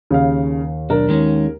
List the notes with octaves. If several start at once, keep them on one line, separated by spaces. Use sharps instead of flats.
D#2 C#3 F5
B1 D4 A#4
D#3 G#3 C#4